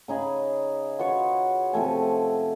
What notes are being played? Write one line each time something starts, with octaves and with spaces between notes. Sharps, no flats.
C#3 D#4 G#4 B5
F4 F#4 B4 C#5
C3 F3 A3 G#5